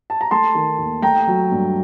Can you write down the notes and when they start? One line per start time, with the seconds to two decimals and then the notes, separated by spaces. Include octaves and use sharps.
0.10 A5
0.21 A#5
0.31 A3 A5 C6
0.55 D#3
0.78 D#2
1.02 A3 G5 A#5
1.27 F#3
1.51 G2